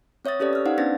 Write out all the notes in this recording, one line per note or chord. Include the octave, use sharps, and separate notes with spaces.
C4 C#5 E5 D#6 A6
C#4 G4 A4 B4 D5
E6 F6
D#4 C5 D5 F5 F#5
B3 C#4 D4 B4 A6 A#6